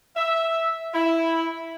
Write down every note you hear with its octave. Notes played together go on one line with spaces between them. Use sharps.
E5
E4